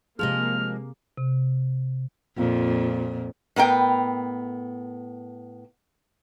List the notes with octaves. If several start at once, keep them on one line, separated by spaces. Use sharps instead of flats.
C3 F3 G#3 A#3 G#4 D#5 F6
C3
F2 A#2
A2 B3 A#4 G5